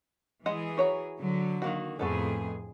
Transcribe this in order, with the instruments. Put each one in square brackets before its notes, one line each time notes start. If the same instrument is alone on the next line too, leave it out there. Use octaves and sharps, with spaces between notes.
[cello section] E3 G#4 [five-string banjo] G#3 D#5 F#5
[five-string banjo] F#4 C#5 A#5
[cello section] D3 F#3
[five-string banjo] D#3 A#3 F#4
[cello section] F2 A2 G#4 [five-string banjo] A3 B3 A4